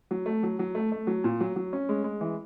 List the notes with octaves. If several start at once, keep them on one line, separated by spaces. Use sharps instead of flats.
F#3
A3
F#3
F#3
A3
A3
F#3
A#2
F#3
F#3
C#4
G#3
G#3
E3